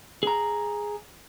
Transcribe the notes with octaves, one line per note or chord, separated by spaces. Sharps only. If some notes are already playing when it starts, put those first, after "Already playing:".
G#4 A#5